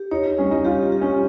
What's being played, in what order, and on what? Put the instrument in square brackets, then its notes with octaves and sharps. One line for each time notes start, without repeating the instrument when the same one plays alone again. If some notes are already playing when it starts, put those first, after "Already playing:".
Already playing: [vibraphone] G4
[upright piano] D#4 [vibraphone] C#5
[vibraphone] G3 [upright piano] C#4
[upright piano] D#4
[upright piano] F4 [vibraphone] G4
[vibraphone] G4
[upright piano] C#4